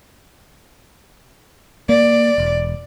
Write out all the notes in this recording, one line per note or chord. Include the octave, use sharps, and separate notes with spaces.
A#3 D5
E1